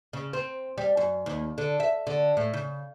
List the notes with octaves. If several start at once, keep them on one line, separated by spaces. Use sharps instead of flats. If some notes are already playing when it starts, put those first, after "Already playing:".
C#3
C4
G3
F#2
D#2
D3
E5
D3
A2
C#3